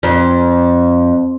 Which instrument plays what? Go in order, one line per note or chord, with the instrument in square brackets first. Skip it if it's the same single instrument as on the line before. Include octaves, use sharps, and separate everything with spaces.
[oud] F2